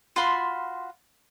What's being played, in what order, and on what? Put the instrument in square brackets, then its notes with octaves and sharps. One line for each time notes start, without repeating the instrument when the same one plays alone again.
[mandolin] F4 F#4 B5 C6